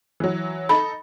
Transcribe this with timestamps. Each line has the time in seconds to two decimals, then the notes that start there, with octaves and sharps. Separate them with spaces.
0.20 E3 F#3
0.69 D#4 A4 B5